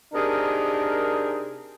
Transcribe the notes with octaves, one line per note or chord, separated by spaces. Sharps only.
C3 D4 D#4 G#4 A#4